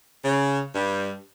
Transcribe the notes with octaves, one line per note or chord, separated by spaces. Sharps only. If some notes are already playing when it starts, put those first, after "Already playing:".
C#3
G2 G3